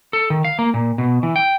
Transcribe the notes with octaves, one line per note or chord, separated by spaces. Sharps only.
A4
D#3
F5
A#3
A#2
B2
E3
G5